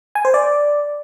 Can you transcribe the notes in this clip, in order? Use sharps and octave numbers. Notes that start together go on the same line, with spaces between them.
G#5
C5
D5